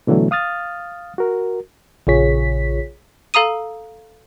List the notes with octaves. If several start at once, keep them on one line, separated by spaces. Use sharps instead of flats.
B2 D3 E3 F#3 A3
F5 D#6 F6 A6
F#4 A#4
A#1 C#3 F4 G#4 C#5 B6
A4 F5 A#5 D#6 D#7